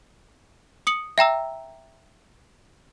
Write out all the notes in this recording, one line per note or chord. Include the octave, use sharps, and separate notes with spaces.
D#6 C#7 F#7
E5 G5 A#5 E6